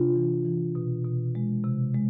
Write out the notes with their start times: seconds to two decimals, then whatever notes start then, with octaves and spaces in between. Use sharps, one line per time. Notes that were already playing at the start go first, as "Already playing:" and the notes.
Already playing: C3 D4 F4
0.15 E3
0.45 E3
0.75 B2
1.04 B2
1.35 G#3
1.64 C3
1.94 G#3